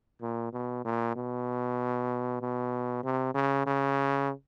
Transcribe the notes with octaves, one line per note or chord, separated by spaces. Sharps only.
A#2
B2
A#2
B2
B2
C3
C#3
C#3